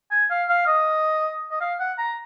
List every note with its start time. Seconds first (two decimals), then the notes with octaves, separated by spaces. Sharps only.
0.11 G#5
0.31 F5
0.49 F5
0.67 D#5
1.51 D#5
1.61 F5
1.80 F#5
1.98 A#5